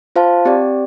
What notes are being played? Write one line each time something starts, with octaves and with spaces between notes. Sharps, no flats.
F4 C5 F5 A5
C4 G4 D5